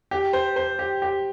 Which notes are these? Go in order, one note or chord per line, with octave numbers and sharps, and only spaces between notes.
G4
C5
C5
G4
G4